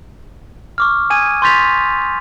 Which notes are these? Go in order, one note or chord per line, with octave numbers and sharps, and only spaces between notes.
C#6 D6 F6
G#5 D#6 G#6 D#7
C6 C#6 G6 A6 B6 F7